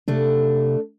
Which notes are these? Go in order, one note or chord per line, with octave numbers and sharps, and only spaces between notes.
C3 A3 D4